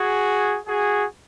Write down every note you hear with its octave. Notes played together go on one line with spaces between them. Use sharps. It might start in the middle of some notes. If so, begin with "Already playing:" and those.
Already playing: F#4 G#4
F#4 G#4